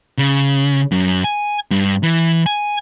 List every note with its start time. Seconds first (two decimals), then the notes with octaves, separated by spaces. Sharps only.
0.18 C#3
0.92 F#2
1.24 G#5
1.71 G2
2.03 E3
2.46 G#5